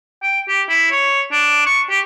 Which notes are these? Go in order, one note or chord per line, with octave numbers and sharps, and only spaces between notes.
G5
G4
E4
C#5
D4
C#6
G4